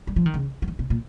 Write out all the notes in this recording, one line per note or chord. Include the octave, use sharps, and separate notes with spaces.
G3
F3
D#3
C#3
F3
D#3
C3
A#2